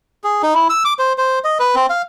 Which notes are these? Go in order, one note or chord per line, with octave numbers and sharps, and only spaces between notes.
G#4
D#4
E4
E6
D6
C5
C5
D#5
B4
C4
F5